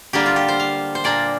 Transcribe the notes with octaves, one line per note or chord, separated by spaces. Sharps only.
D3 G3 A#3 D4 G4
F4
G4
C5
F5
C5
A#2 A#3 D4 D5